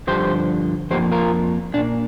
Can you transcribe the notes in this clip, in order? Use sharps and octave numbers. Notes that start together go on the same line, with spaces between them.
G2 D3 F3 G4 C5
F2 F3 A#3 G4 C5
F4 A#4
A#2 A#3 D4